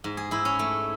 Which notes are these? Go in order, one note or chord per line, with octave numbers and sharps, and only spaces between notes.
G#2
G#4
G#2 E4
C#4
A3